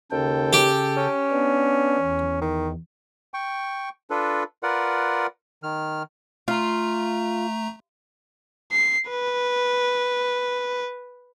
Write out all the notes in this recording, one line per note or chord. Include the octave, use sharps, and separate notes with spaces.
D#2 C#3 A4 G5
G4
C#4
B3 D4
E2
D#3
G5 C#6
D4 F4 A4 B4
F4 A#4 B4 D5 F#5
D#3 F6
A3 F4 A#5
C7
B4